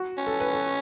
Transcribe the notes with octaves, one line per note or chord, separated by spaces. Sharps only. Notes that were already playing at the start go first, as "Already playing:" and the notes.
Already playing: F#4
C#4
A4
B4
A4